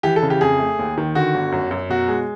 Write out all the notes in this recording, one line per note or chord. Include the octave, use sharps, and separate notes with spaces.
E3 G4
A4
C#3
G4
F2 G#4
A3
D#2
D#3
D3 F#4
G1
F#2
F#2
B2 F#4
G#3